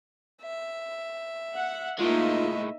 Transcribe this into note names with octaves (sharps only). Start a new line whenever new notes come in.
E5
F#5
A2 G#3 A#3 D#4 F4 D#5 E5